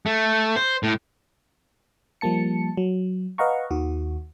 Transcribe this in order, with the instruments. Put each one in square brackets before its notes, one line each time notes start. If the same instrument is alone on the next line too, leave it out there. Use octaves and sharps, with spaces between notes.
[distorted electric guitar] A3
C5
A2
[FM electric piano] F3 G3 A#3 A5 C#7
F#3
B4 D#5 F5 F#5 A#5 C#6
D#2 D#3 F#4